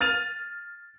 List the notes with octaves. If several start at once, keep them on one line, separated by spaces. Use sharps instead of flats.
F6 A6 D#7 F7